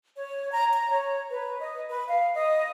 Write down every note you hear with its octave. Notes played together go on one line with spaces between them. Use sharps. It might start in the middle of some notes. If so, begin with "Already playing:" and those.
C#5
A#5
A#5
C#5
B4
D#5
B4
F5
D#5